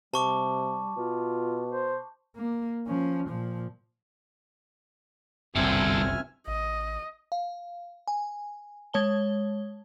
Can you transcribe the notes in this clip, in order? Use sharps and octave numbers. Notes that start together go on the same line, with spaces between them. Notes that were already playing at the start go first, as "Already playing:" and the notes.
C3 G3 A5 C#6 D6
B2 F4
C5
A#3
F3 C#4
A#2 F3
F#1 C2 G2 D3 C4 E5 G#5 F6
A1 D#5
F5
G#5
G#3 C#5 A5 G7